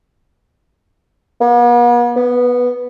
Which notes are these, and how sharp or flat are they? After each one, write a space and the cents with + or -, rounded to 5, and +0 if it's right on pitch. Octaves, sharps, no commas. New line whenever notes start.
B3 -45
B3 -5